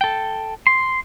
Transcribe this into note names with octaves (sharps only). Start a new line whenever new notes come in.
A4 G5
C6